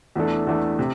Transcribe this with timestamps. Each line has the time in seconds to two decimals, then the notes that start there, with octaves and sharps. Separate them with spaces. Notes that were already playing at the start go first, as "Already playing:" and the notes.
0.16 E2 E3 A3 D4 A4
0.47 E2 E3 A3 D4 A4
0.79 C3